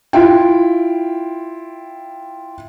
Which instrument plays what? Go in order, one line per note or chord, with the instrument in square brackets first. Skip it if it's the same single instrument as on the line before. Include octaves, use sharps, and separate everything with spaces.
[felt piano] E4 F4 G5